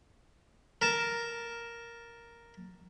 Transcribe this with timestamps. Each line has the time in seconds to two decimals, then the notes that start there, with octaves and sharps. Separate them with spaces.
0.82 A#4 A5